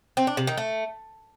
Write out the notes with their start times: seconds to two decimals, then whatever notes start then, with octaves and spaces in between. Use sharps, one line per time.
0.17 C4
0.27 D4
0.37 C3
0.47 D#3
0.58 A3